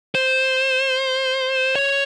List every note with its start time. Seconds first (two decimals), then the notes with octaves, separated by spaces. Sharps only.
0.15 C5
1.76 C#5